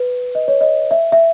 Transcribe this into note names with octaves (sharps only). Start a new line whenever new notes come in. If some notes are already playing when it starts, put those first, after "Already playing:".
Already playing: B4
D#5
C#5
D#5
E5
E5